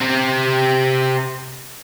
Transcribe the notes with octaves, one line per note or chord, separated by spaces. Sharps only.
C3 C4